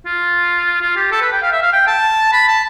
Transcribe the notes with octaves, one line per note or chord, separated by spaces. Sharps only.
F4
F4
G4
A4
B4
G5
F5
E5
F5
G5
A5
B5
A5